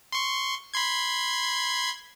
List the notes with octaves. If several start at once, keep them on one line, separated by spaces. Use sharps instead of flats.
C6 C#6
B5 C6 G#6